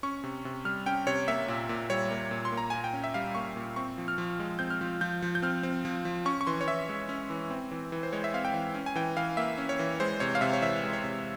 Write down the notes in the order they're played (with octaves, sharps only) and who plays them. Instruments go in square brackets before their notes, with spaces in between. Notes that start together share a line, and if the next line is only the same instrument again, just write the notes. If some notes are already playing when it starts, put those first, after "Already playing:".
[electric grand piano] C#4 C#6
C3
C3
G3 F6
C#4 G5
C3 C#5
A#3 E5
A#2
A#2
G3 C#5
A#3
A#2
C6
A#3
A#5
A#2 G#5
G5
C#4
E5
G3 F5
A#3 C#6
A#2
C4 C#6
F3
F6
F3
G#3
C4 G6
F6
F3
F3 G6
F3
G6
C4 F6
C4
F3
F3
C#4 C#6
C#6
E3 C6
C#5
E3 E5
G#3
C#4
E3
C4
E3
E3
C5
G#3 C#5
E5
C4 F5
G5
E3
C#4
G#5
E3 G5
E3 F5
A#3 E5
C#4
C#5
E3
G#3 C5
C3 C#5
F5
C3 E5
C#5
E3 E5
G#3
C#5
C3